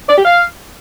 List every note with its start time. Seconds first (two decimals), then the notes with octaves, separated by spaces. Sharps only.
0.09 D5
0.17 G4
0.25 F5